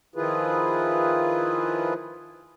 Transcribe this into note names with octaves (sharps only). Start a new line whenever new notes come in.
D#3 F3 E4 F4 G#4 B4